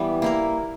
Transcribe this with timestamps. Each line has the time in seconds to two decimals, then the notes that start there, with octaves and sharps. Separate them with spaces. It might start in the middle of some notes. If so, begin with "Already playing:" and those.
Already playing: E3 G3 B3
0.22 A#3 E4 A#4